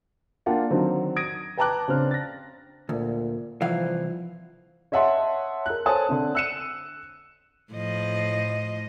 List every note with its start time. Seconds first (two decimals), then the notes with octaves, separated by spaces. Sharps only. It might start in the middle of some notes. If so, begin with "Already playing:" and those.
0.46 A#3 D4 F4 F#5 G5
0.70 D3 D#3 F#3 C4 D#4
1.16 D#6 G#6 A#6 D7
1.57 B4 G5 A5 A#5 D6 F#6
1.88 C#3 C4 D4 F6
2.11 A6 A#6
2.89 D2 A#2
3.61 C2 E3 F3 F5
4.92 C#5 D#5 E5 F#5 A5 C6
5.66 A#4 F#6
5.85 A4 C5 C#5 G#5 A5 D#6
6.09 D3 C4
6.35 E6 F#6 C#7 D#7 E7
7.73 A2 F3 D#5